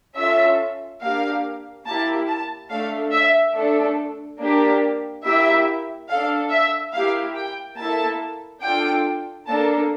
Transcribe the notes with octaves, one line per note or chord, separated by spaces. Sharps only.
C#4 F4 A4 E5
A#3 D4 G4 F5
A#3 E4 G4 A5
A5
A3 D4 A4 F5
E5
A3 D4 A4
A#3 D4 G4
A#3 E4 G4 E5
D4 A4 F5
E5
A#3 E4 G4 F5
G5
A#3 E4 A4 A5
D4 F4 A4 G5
A#3 D4 A4 A5